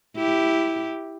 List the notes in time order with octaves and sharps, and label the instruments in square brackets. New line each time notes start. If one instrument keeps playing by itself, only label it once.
[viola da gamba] E4 G4